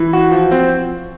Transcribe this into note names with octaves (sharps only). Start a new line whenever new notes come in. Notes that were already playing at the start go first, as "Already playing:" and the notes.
Already playing: E3
F#4
F3
C4